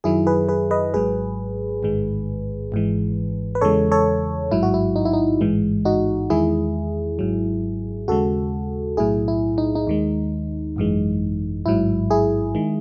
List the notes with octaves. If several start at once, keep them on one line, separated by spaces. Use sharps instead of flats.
F#2 D#3 F#3 E4 G#4
G#4 B4
G#4 B4
B4 D#5
G#1 G#2 F#3 G#4 B4
A1 G#2 D#3 G#3
G#1 G#2 E3 G#3
B4
E2 C#3 E3 G#3 A4 C#5
A4 C#5
A1 G#2 F#3 E4
F#4
E4
D#4
E4
D#4
A1 G#2 E3 G#3
D#4 F#4
E2 D#3 G#3 E4 G#4
G#1 G#2 F#3
D#2 C#3 G#3 F#4 A4
B1 A2 F#3 E4 G#4
E4
D#4
D#4
D#2 D#3 G#3
G#1 F#2 E3 G#3
A1 G#2 F#3 E4
E4 G#4
D#3 G#3